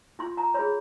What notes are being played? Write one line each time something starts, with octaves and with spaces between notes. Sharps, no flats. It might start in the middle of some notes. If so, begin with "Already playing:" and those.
F4 C6
A#5
G#4 C#5 B5